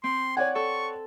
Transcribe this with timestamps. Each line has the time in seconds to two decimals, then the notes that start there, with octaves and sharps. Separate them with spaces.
0.04 C4 C6
0.37 C#5 D5 F#5 G#5
0.55 A4 C#6